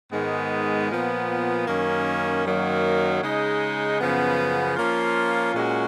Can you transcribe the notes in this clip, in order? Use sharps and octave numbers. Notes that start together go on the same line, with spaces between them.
G#2 D#3 G#3 B3
A#2 F3 B3
F#2 D#3 A#3 C#4
F#2 D#3 F#3 A#3
C#3 G#3 D#4
F#2 C#3 F3 B3
F3 A#3 C#4 F4
A#2 G#3 C#4 F#4